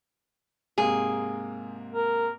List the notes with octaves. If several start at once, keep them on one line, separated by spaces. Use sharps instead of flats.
G#2 C3 A#3 G#4
A#4